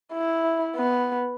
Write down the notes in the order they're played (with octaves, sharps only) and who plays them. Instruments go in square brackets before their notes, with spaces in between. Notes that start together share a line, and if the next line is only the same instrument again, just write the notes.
[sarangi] E4
B3